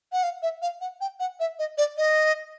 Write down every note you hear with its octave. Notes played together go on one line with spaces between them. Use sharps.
F#5
F5
E5
F5
F#5
G5
F#5
E5
D#5
D5
D#5